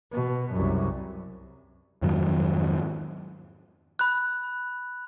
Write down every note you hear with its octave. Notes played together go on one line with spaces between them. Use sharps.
B2
C2 F#2
F2 G#2 D#3 F#3
B5 F#6